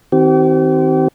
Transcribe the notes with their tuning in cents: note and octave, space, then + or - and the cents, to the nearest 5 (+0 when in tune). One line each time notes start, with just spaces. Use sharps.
D#3 +35 C4 +0 G4 -40